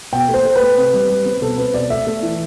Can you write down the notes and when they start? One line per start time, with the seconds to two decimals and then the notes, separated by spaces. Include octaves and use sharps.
0.13 B2 G5
0.29 A3 C5
0.45 A3
0.56 B4
0.61 A3
0.77 C3
0.94 G3
1.09 G3
1.26 C4
1.42 B2 A4
1.58 C4 B4
1.74 B2 D5
1.90 A3 E5
2.07 A3
2.23 E3